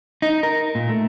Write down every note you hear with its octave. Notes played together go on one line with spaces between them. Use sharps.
D#4
A#4
A#2
A3